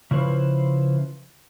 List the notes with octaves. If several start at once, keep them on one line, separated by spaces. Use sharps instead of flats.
C#3 F3 E4 B4 C5